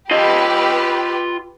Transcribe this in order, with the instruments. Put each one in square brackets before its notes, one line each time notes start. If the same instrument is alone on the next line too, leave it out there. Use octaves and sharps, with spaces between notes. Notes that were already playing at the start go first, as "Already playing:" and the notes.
[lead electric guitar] F4 D#5 [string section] G4 B4